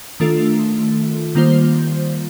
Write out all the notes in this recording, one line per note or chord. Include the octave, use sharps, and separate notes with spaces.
D#3 A3 D4 F4 A4
D#3 G3 A#3 F4 C5